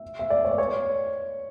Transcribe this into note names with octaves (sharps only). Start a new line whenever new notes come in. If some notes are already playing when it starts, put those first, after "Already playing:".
Already playing: E5
E5
D5
C#5
D5
C#5